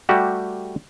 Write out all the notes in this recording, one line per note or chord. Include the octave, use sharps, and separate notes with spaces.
G3 A3 F#4 G4